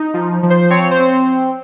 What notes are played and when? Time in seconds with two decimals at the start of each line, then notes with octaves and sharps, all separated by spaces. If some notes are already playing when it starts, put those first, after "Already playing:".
Already playing: D#4
0.14 F3
0.43 F3
0.50 C5
0.70 C4 C#5
0.91 C5
0.99 C4